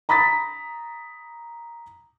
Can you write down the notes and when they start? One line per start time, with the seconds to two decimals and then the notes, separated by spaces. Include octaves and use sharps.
0.09 A#5 B5 D#6 A6 B6